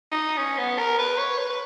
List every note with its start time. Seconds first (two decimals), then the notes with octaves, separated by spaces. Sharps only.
0.11 D#4
0.38 C#4
0.58 B3
0.78 A#4
0.99 B4
1.18 C#5
1.38 B4
1.50 B4